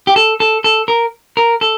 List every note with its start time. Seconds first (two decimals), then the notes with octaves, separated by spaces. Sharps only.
0.07 G4
0.16 A4
0.40 A4
0.64 A4
0.88 A#4
1.37 A#4
1.61 A4